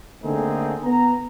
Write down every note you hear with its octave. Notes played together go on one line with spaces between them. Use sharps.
D3 A3 A#3 C4 D#4 G#4
B3 A#5